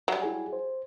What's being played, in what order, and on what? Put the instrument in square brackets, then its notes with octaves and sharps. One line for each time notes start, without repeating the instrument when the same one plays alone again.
[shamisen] F#3 G3
[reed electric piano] E4 G#4 G#5
C5